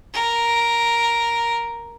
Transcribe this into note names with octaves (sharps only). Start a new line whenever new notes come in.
A#4